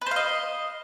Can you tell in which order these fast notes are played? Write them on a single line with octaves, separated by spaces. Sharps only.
B4 C5 F5 D#5